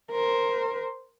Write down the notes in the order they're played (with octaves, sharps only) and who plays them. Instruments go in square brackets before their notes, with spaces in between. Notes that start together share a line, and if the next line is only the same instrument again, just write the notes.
[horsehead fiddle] A#4 C5